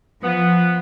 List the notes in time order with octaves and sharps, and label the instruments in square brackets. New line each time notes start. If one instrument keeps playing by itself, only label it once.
[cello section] F3 [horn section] B3